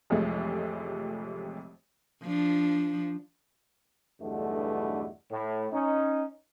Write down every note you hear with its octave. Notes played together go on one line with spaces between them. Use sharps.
A1 F2 C3 G#3 A3
F3 D4
B1 E2 G2 B2 D3 A3
A2
C#4 D#4